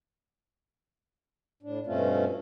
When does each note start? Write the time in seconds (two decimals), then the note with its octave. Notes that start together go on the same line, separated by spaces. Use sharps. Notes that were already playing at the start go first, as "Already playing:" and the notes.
1.63 A2 D4
1.87 G2 B2 A3 C4 C#4 F4